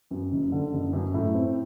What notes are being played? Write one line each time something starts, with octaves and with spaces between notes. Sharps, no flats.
F#2
F#1
D3
F#1
F#2
A2
C4